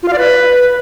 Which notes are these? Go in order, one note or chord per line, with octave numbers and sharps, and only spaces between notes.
F4
F5
D5
B4